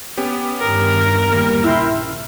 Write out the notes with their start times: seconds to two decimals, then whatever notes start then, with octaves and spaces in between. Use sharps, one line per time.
0.17 B3 C#4 G4
0.59 E2 G2 D#3 A#4
1.32 G3 A#3
1.64 A#1 C#3 E4 G5 C6 E6 F6